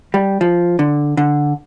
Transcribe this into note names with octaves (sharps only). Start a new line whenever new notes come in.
G3
F3
D3
D3